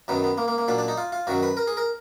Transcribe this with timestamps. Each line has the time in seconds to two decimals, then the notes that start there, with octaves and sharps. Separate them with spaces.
0.08 F#2 D#3 F#3 B3
0.24 B3
0.38 A#3
0.48 A#3
0.58 A#3
0.68 A#2 F#3 D4
0.78 D4
0.88 D#4
0.97 F4
1.12 F4
1.27 F#2 D#3 F#3 F#4
1.43 B4
1.57 A#4
1.67 G#4
1.77 A#4